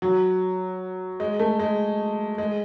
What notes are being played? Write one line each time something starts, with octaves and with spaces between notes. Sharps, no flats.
F#3
G#3
A3
G#3
G#3